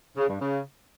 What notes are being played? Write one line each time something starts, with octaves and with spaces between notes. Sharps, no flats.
C#3
G2
C#3